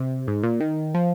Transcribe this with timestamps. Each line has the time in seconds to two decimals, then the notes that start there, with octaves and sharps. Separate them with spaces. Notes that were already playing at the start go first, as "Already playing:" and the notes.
Already playing: C3
0.27 G#2
0.43 A#2
0.61 D#3
0.94 F3